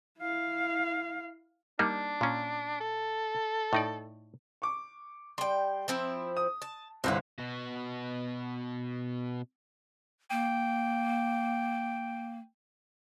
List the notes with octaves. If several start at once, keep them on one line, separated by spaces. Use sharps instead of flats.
E4 F5
G3 A#3 D4 D#4
A#2 C#4
A4
A2 D#4 D5
C#6 D6
G3 G5 C6
F3 C4 E4
D#6
A5
G1 C2 C4 B4 F#5
B2 F#4
A#3 G5